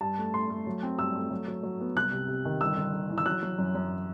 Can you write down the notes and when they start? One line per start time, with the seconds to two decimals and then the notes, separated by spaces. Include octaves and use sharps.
0.01 G2 A5
0.18 A3
0.34 A3 C6
0.50 A3
0.67 F#3
0.83 C4
0.98 G2 E6
1.16 A3
1.31 F#3
1.48 F#3
1.63 F#3
1.80 B3
1.96 C2 F#6
2.13 C3
2.28 C3
2.45 D#3
2.61 G1 E6
2.77 G1
2.93 G1
3.10 E3
3.18 E6
3.26 F#3 F#6
3.43 F#3
3.59 F#2
3.75 F#2